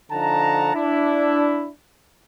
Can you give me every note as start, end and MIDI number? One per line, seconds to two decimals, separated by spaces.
0.12 0.71 50
0.12 0.71 53
0.12 0.71 63
0.12 0.71 78
0.12 0.71 81
0.12 0.71 82
0.75 1.69 62
0.75 1.69 64